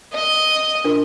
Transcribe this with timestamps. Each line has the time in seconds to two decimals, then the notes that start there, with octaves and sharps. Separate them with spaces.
0.14 D#5
0.84 D4 F4 A#4